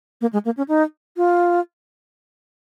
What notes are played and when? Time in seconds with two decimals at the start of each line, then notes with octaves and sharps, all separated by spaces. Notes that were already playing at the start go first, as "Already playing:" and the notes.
0.21 A#3
0.33 G#3
0.45 A#3
0.57 C#4
0.68 D#4
1.17 F4